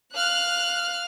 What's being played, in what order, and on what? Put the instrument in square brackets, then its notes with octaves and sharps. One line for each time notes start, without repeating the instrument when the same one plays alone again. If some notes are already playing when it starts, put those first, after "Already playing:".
[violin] F5 F6 [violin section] F#6